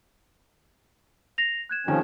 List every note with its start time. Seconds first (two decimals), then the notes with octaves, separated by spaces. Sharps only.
1.38 A#6 C7 F7
1.69 F#6 G#6 E7
1.87 C3 D#3 F3 A3 C#4